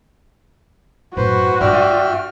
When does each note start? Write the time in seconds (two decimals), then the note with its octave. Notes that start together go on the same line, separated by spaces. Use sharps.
1.17 F#2 A2 F#4 B4 C5
1.61 G2 F4 D5 E5 G5 F6